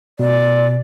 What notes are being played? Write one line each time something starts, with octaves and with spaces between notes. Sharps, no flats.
B2 D5